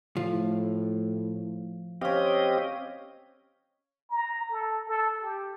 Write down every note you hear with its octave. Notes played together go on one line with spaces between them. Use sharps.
A2 F3
C4 C#4 G4 D#5 F5
A#5
A4
A4
G4